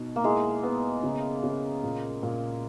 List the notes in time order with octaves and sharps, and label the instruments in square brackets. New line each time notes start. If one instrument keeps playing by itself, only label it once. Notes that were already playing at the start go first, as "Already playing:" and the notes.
Already playing: [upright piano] B2 D#4
[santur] A#3
[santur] G#3 [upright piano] E4
[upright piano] B3
C#3
C#3
A#2
A#2